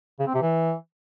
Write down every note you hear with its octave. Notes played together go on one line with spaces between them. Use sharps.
C#3
C4
C3
E3